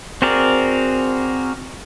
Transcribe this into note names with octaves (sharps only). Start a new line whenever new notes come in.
C4 F#4 G#4 A#4 D5